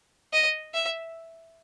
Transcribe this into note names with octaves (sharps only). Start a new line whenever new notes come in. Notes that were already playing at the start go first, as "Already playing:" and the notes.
D#5
E5